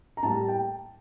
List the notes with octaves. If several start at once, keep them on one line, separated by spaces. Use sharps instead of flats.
A#5
A2 G3 A#3 A5
G5